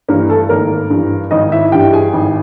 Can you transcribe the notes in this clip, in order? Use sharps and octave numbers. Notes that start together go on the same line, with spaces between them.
G2 E3 A#3 A#4
A3 A4
G#1 A#3 A#4
G2 E3
G#1 D#4 D#5
E4 E5
G2 E3 G4 G5
G#4 G#5
G#1